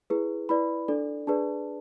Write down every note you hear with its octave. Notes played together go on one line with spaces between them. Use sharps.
E4 G#4 B4
E4 B4 D5 B5
D4 A4 D5
D4 G#4 B4 D5 A5